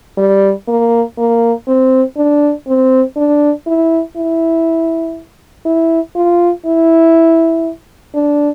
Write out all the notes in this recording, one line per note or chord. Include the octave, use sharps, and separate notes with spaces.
G3
A#3
A#3
C4
D4
C4
D4
E4
E4
E4
F4
E4
D4